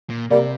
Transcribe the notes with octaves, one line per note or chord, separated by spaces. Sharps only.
A#2
C3 G3 A#3